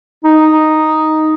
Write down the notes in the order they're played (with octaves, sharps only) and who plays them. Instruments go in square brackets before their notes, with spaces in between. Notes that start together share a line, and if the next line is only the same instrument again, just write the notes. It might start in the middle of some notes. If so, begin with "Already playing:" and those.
[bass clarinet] D#4